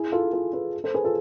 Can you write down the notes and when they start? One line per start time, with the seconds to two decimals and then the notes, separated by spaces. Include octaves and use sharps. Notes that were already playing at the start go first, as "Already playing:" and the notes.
Already playing: E4 G#4
0.12 F4 A4
0.33 F4 A4
0.53 G#4 B4
0.84 A4 C5
0.94 G#4 B4
1.04 F4 A4